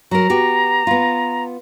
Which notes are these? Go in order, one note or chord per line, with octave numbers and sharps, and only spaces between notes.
F#3 A#4 A#5
B3 F#4 G4
B3 F4